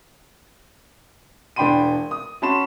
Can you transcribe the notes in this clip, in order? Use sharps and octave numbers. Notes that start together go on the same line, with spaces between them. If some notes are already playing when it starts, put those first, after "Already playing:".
E1 D4 G5 B5 C6 D#7
D#6
C#4 F#4 A5 B5 C6 E7